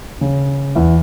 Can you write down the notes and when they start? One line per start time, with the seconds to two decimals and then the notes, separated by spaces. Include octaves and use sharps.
0.21 C#3
0.75 E2 E3